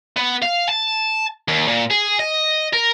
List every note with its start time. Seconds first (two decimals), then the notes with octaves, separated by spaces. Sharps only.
0.17 B3
0.42 F5
0.69 A5
1.48 D#2
1.68 A#2
1.90 G#4
2.19 D#5
2.73 A#4